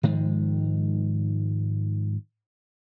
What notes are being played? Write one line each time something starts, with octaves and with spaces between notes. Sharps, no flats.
G#2 D#3 F3 G#3